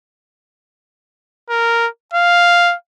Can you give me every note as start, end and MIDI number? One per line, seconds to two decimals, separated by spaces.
1.50 1.88 70
2.13 2.75 77